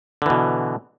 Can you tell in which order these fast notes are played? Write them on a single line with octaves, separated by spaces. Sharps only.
D3 E3 B2